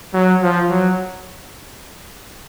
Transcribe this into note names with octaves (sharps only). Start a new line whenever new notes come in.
F#3
F3
F#3